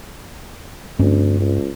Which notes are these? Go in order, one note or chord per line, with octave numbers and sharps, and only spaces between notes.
D2 G2 C4 C#4
C#2